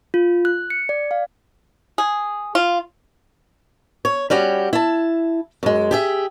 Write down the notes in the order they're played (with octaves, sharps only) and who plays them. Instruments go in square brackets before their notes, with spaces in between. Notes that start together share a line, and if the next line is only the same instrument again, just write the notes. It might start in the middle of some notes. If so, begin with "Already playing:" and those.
[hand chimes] F4
F#6
C#7
D5
F5
[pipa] G#4
F4
[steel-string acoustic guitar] C#5
G3 C#4 F#4 G4
E4 A5
F#2 G#3
G4 G#4 E5